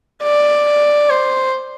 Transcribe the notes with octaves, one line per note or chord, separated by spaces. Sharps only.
D5
C5